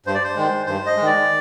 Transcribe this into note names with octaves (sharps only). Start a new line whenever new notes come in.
G2 C5
D5
C5
D#3 G#3
G2 C5
D#5
G#3
D#3 D5